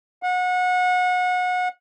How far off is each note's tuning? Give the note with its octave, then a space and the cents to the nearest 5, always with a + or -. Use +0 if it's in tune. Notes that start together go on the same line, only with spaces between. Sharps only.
F#5 -30